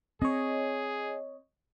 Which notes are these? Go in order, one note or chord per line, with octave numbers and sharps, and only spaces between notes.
C4 G#4 C#5 D#5